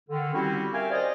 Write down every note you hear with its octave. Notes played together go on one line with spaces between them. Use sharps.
D3 D#3
G3 C4 C#4 E4 F#4 G4
A#4 E5 F5 G5 G#5
C5 D5 D#5